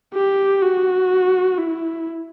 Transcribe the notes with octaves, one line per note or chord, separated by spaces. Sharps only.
G4
F#4
E4